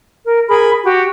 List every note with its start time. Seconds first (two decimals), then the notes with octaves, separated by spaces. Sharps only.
0.25 A#4
0.47 G#4 A#4 B5
0.83 F#4 G4